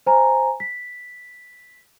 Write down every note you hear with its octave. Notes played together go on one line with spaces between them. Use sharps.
C5 G#5 A#5
B6